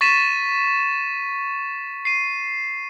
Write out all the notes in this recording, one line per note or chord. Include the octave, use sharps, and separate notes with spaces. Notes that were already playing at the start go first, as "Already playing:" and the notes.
C#6 A6 B6 D#7 E7
C7 D#7